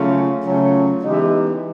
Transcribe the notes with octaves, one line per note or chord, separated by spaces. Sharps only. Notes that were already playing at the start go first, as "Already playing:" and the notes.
Already playing: C#3 F#3 A3 C#4 F4
C#3 F#3 A3 C#4 F4
E3 G#3 B3 D#4 G4